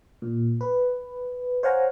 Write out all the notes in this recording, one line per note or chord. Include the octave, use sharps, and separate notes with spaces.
A#2
B4
C5 C#5 F5 F#5 G#5 A#5